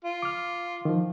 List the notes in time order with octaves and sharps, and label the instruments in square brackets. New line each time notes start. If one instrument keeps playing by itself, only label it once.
[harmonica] F4
[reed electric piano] D6 F6
D#3 F3